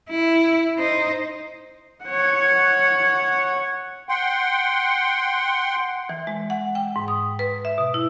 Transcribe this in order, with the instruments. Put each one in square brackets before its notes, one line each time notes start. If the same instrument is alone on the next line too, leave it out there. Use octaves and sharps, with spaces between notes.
[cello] E4
D#4 C5
[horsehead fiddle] C#5 F#5
[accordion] F#5 G5 C6
[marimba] E3
G#3
F#5
G5
G#2
D#6
B4
E5
B2
E4